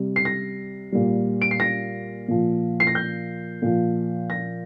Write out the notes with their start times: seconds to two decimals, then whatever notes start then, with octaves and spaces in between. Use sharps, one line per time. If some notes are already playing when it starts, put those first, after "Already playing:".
Already playing: C3 G3
0.16 C7
0.25 A#6
0.92 A#2 G3
1.42 D7
1.51 C7
1.60 A#6
2.28 A#2 F3
2.80 C7
2.87 A#6
2.95 G6
3.62 A#2 F3
4.30 A#6